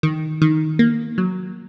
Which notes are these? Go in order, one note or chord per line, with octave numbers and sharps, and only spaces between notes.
D#3
D#3
A#3
F#3